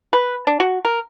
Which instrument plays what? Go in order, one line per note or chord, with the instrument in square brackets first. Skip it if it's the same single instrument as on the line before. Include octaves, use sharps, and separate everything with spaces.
[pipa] B4
D4
F#4
A#4